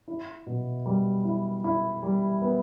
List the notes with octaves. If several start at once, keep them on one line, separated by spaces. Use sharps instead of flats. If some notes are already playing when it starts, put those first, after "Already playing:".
E4
B2
G3
E4
E4
G3
B3